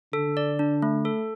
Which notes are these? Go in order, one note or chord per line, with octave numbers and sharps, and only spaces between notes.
D3 A4
D5
D4
A3
A4